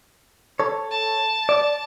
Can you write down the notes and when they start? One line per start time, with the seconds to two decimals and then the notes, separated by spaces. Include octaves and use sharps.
0.60 A4 C#5
0.91 A5
1.49 D5